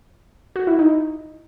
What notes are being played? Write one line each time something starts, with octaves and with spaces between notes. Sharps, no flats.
F#4
E4
D#4